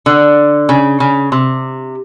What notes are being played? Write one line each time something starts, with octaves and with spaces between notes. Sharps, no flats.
D3
C#3
C#3
C3